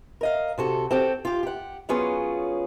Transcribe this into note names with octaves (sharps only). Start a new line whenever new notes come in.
A#4 D#5 F5
C3 F#4 A4
C4 F#4 G4 A4
F4 G4
G4 F#5
F#3 B3 C#4 F4 G#4